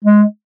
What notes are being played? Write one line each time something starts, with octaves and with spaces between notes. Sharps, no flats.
G#3